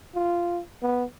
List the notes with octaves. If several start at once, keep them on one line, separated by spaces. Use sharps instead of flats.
F4
B3